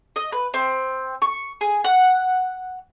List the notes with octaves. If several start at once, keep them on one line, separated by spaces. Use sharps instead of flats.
D#5
B4
C4
C#6
G#4
F#5